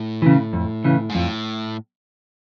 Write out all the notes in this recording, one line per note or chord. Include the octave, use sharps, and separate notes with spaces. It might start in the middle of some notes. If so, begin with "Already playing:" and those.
Already playing: A2
C#3 E3
F2
C#3 E3
G#2
F2 A2